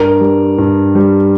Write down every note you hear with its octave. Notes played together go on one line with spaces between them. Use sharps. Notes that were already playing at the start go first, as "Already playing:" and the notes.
Already playing: G2 A#4
G3
G2
G3